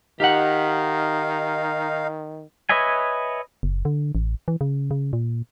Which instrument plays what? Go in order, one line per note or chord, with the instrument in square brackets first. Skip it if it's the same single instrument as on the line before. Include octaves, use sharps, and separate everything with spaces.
[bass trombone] D#3 [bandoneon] D#4 F5 [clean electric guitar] G4 F#5
[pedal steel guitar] B4 C#5 D#5 E5 G#5
[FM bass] F#1
D3
A1
E3
C#3
C#3
A#2